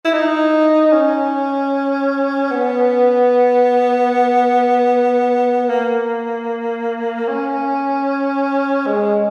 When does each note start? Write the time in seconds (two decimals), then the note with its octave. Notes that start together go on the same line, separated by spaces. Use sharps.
0.05 E4
0.13 D#4
0.92 C#4
2.51 B3
5.69 A#3
7.28 C#4
8.87 G#3